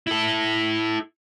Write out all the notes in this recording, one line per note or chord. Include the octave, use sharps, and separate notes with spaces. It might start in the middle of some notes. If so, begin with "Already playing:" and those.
E4 A4